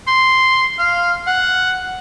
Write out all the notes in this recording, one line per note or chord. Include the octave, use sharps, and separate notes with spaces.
C6
F5
F#5